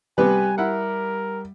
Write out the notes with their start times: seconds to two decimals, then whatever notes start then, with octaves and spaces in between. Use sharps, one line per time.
0.18 C3 G3 B3 B4 G#5
0.58 E4 A#4 F#5